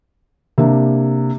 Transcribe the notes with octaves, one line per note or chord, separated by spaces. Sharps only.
C3 A#3 D4